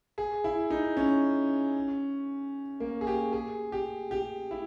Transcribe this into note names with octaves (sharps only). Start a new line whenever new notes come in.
G#4
E4
D#4
C#4
A#3
G#4
G4
G#4
G4
G4
E4